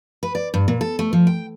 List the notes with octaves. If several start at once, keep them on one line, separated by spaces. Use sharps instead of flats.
B4
D5
G2
A#2
A4
A3
F3
G5